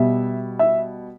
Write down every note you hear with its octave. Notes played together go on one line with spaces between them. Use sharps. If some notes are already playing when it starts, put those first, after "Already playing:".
Already playing: B2 G3 E5
E5